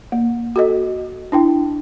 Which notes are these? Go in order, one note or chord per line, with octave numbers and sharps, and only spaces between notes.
A#3
F#4 A4 D#5
D4 E4 G5